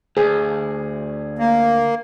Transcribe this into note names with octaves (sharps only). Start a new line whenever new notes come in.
D2 G#4
A#3